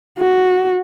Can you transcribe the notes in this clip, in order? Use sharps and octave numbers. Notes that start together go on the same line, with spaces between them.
F#4